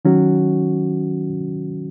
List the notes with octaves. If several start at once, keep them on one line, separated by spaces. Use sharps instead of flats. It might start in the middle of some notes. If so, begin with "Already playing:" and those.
D#3 F#3 C#4 F#4